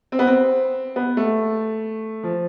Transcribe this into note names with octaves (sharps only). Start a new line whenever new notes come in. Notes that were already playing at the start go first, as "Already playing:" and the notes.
C4
B3
C4
B3
A3
F3